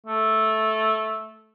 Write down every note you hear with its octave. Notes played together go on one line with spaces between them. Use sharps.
A3